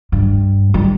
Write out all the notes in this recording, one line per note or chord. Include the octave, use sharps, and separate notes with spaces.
G2
G3